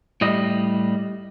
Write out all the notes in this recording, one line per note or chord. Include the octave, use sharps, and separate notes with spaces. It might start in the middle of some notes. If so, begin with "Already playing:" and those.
A2 G3 D#5